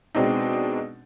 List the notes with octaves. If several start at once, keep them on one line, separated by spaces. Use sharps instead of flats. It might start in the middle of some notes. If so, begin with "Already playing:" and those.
B2 G#3 C4 D4 D#4